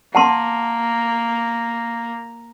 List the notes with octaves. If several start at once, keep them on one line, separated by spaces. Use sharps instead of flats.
A#3 F#5 A5 C6